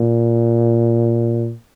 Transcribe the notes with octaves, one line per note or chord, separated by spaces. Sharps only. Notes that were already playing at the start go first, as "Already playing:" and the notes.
Already playing: A#2